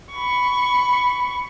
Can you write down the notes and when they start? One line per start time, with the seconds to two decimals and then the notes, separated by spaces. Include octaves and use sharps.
0.12 B5 C#6